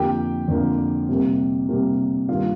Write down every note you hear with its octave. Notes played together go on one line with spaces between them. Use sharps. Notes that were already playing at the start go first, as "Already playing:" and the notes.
Already playing: F2 D3 F3 A#3 G4 G5
F2 D3 F3 A#3
C3 G3 A#3
C3 G3 A#3
G2 D#3 G3 A#3 F4 F5